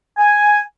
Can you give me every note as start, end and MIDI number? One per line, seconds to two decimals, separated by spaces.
0.18 0.61 80